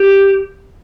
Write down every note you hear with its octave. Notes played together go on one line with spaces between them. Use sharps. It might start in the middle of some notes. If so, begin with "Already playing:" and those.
Already playing: G4